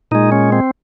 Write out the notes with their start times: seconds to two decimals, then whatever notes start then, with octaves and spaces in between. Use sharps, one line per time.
0.11 A#2 G#3 D#4
0.32 C#4
0.52 C4